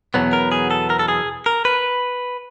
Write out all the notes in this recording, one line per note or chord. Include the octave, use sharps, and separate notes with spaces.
E2 B2 F#3 B3
A#4
G#4
A4
A#4
A4
G#4
A#4
B4